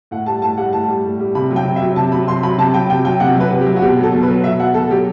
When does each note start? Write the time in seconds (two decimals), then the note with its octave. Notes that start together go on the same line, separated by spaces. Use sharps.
0.11 A2 F#5
0.26 G3 A5
0.42 A2 A5
0.57 G3 F#5
0.73 A2 A5
0.88 G3
1.05 A2
1.20 G3
1.35 C3 B5
1.51 F#3
1.56 G5
1.65 C3
1.76 E5
1.81 F#3
1.96 C3 A5
2.12 F#3 B5
2.27 C3 C6
2.43 F#3 B5
2.58 C3 A5
2.74 F#3 G5
2.90 C3 G5
3.05 F#3 G5
3.20 C3 F#5
3.36 F#3 B4
3.51 C3
3.61 G4
3.66 F#3
3.76 F#4
3.82 B2 G4
3.98 F#3
4.03 A4
4.12 B2
4.23 B4
4.28 F#3
4.44 B2 E5
4.59 F#3 F#5
4.74 B2 A4
4.90 F#3 G4